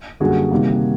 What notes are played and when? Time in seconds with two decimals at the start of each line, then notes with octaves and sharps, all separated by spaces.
0.20 F#2 D3 G3 A#3 F#4 G#4
0.51 C3 D#3 G3 A#3